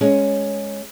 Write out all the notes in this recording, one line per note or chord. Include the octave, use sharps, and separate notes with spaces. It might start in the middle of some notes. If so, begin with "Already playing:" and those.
G#3 C#4